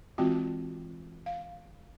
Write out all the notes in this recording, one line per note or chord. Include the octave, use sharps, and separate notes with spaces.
E3 G#3 C4 F4 F#4 G5
F5